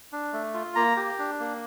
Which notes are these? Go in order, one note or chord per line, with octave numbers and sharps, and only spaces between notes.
D4
A3
F4
A#3 A#5
G4
D4
A#3